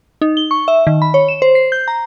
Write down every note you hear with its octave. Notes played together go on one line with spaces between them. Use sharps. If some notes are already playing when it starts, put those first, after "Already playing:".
D#4
G7
C#6
E5
D#3
B5
C#5
E7
C5
C7
G6
A#5